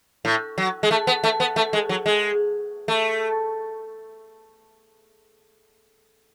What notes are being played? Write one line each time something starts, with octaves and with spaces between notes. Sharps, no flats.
A2
F#3
G#3
A3
B3
A3
B3
A3
G#3
F#3
G#3
A3